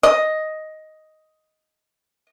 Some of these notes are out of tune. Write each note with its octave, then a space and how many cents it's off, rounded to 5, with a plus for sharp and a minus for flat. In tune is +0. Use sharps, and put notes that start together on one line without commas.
D#5 +5